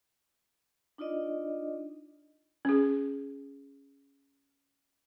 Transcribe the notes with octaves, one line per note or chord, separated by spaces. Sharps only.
D4 D#4 F4 D5 D#5
C#4 G#4